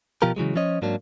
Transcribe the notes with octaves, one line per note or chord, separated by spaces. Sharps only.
B2 F3 F4 G4 A#4
C#3 E3 F#3 G#3
F3 C#4 C#5 D#5
G#2 F#3 A#3 D4